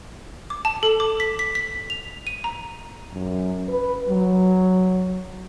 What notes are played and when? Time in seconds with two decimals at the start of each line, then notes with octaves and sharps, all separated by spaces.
0.50 D6
0.65 A5
0.83 A4
1.00 D6
1.20 B6
1.39 B6
1.55 B6
1.90 F7
2.27 D#7
2.44 A#5
3.13 F#2
3.69 B4
4.08 F#3